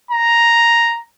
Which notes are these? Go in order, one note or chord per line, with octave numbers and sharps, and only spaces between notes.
A#5